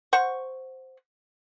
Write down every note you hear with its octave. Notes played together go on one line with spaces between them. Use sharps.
C5 F#5 C#6